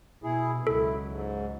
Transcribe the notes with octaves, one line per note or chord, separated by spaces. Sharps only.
B2 E4 G#4
C#2 F#3 E4 A4
G#2